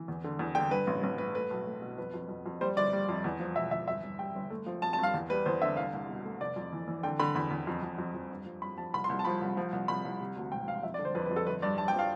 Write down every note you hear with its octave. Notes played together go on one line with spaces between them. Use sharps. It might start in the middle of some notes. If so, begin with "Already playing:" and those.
Already playing: E3
E2
D3
E2
D3 G5
G2 B4
A1
A1 B4
G2 B4
A3 B4
B1
A3
B2
F2 B4
F2
F2
F2
G3 C5
G1 D5
G3
F2
E2
F3
E1 E5
E2 E5
G1 E5
G1
G3 G5
G1
A3
F3
F3 A5
A5
G2 F5
E2
G3 B4
E2 C5
D3 E5
C2 F5
C2
B2
A3
F1 D5
F2
E3
E3
D3 G5
D3 B5
E2 B5
E2
F2
F2
F2
F2
G2
F3
G2 B5
F3 A5
C2 B5
C6
C2
A5
F3 B5
C2
F3
C2
C2 B5
C2
C3
D2
E1 G5
E1 F5
F2 E5
D5
D3
C5
F2 B4
B4
F2
A4
G1 B4
G2 D5
G2 A5
G5
F3 F5